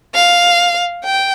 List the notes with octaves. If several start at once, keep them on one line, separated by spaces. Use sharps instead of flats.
F5
G5